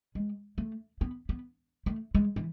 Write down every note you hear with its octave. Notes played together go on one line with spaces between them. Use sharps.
G#3
A3
B3
B3
A3
G#3
E3